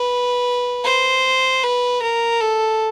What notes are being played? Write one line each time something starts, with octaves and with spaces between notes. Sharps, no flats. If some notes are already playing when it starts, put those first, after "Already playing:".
Already playing: B4
C5
B4
A#4
A4